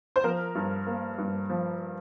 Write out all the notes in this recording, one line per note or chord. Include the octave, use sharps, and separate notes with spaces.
C5
F3 A#4
G2
A#3
G2
F3